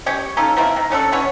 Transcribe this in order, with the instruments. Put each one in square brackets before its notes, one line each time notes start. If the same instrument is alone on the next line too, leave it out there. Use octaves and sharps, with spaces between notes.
[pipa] C#4 G4 C#5
C#4 D#4 F4 A4
F3 A#3 C4 E4
D#3
A3 C#4 D4 A4
E3 B3 C#4 C#5